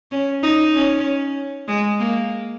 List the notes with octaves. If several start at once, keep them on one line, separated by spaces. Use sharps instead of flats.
C#4
D#4
C#4
G#3
A#3